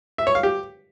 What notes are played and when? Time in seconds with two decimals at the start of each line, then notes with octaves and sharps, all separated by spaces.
0.18 E5
0.27 C#5
0.35 F5
0.43 G4